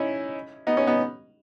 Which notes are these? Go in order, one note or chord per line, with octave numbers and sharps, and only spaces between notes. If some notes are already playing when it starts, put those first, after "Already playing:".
Already playing: C#4 D#4 E4
B3 D#4
C#4
B3 D#4